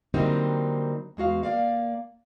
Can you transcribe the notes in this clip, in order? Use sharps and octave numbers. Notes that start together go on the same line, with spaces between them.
D3 F#3 G3 A#3 C4 D#4
E2 G#3 F#4 F5
A#3 D5 F5